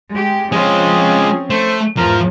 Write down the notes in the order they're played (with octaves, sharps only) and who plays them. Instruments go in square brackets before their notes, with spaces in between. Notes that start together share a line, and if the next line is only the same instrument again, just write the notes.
[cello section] G#3 G4
[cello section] F3 C4 C#4 [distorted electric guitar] G#3 F4 [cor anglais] G#4
[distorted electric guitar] A3 [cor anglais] C5
[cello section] E2 G#2 [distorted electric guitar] F3 [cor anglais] A#4